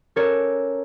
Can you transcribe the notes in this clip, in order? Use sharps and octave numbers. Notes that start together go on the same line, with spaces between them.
C#4 A4 A#4 C#5 D5